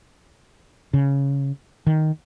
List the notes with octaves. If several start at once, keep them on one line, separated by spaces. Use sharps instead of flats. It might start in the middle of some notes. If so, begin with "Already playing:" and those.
C#3
D#3